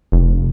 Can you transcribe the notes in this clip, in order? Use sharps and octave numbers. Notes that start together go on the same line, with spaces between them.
F1